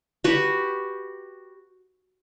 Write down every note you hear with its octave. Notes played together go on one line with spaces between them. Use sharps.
F#4 G4 B4